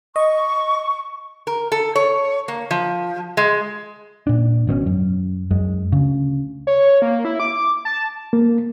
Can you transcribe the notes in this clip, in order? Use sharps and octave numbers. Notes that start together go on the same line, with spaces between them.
D#5 C#6
A#4
A4
C#5
A#3
F3
G#3
A#2 D4
G#1 B2 C4 C#4
F#2
F#2 G#3
D2 C#3
C#5
A#3
E4
D6
A5
A#3